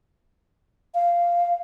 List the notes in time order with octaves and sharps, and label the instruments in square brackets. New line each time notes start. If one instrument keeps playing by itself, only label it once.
[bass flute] F5